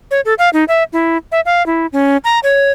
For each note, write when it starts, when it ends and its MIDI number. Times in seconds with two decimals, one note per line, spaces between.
0.11 0.21 73
0.25 0.34 69
0.38 0.49 77
0.53 0.64 63
0.68 0.83 76
0.93 1.17 64
1.32 1.40 76
1.45 1.65 77
1.66 1.86 64
1.92 2.17 61
2.24 2.39 82
2.43 2.72 73